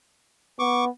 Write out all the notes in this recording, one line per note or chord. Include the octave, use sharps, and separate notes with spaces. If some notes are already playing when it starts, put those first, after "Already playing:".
B3 C#6 D6